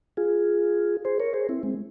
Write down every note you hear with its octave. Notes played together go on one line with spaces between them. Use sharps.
F4 G#4
G#4 C5
A#4 C#5
G#4 C5
C4 E4
G#3 C4